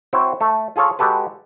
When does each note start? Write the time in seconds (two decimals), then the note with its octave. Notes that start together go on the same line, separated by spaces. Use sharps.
0.13 C4 E4 F#4 C5 C#5 G5
0.40 A3 A4
0.76 F4 G#4 A4 C#5 F5
0.99 G#3 F#4 G4 A4 B4